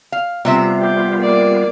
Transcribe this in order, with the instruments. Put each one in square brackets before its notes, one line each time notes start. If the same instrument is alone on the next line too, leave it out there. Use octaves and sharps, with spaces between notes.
[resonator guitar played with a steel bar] F5
[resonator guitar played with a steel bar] C3 C4 E5 [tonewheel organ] G3 B3 F4
[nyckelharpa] G4
A#3 D5